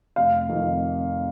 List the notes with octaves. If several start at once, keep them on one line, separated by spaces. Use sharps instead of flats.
F1 F5
F2 D#3